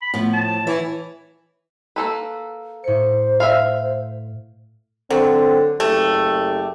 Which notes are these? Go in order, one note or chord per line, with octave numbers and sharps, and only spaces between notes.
B5
A2 F3 B3
A5
E3 C#5 E5
A#3 A4 B4
A2 C5 C#7
E5 F5 F6
D3 F#3 C4
F#1 A3 G4